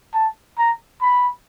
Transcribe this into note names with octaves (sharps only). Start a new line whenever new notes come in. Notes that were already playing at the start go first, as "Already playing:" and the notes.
A5
A#5
B5